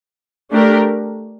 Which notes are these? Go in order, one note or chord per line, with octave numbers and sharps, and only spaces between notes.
A3 D4 G4 A#4